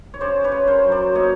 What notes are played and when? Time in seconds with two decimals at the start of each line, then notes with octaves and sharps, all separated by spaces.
0.14 C#5
0.20 C#3 C5 D5
0.44 B4 C#5
0.52 C#3
0.67 A#4 C5
0.84 F#3
0.92 C5 D5
1.15 A#3 C#5 D#5